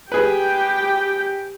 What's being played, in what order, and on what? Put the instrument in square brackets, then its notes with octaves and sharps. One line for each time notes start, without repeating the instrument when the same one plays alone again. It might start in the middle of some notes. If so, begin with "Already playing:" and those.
[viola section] G4 G5 [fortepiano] G#4 B4